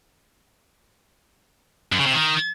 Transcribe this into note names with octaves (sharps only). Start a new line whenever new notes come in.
F#2
C#3
C3
D#3